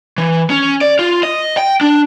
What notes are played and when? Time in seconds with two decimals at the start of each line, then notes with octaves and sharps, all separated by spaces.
0.18 E3
0.50 C#4
0.81 D5
0.99 F4
1.23 D#5
1.57 G5
1.81 D4